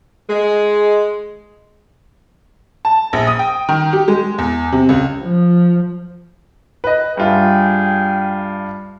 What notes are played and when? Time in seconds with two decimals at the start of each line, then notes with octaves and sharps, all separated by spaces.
0.29 G#3
2.85 A5
3.13 A#1
3.27 D#6
3.39 G5
3.69 D#3
3.93 G4
4.08 G#3
4.38 E2
4.72 C3
4.89 C#2
5.23 F3
6.84 B4 D#5
7.17 G2 F4 G#4 E5 G5